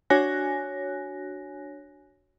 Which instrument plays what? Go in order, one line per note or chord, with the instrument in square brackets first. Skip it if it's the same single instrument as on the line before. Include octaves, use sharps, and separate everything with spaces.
[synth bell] D4 F#4 C#5 G#5 F#6 A#6